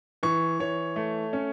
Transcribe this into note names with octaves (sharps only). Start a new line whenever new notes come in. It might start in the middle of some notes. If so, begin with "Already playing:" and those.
E3 C#6
E3 C#5
A3
C#4